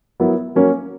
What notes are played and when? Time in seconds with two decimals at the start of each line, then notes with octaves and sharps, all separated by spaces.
0.20 F#3 B3 E4 A#4
0.55 F#3 A#3 C#4